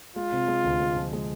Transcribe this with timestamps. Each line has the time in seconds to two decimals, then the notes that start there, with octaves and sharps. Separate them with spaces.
0.16 G#3 F4
0.32 C3
0.48 G#3
0.65 D2
0.80 G#3
0.96 F3
1.13 G#3